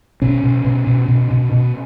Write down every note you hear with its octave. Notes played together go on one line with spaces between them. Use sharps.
B2 C#4
B2
B2
B2
B2
B2
B2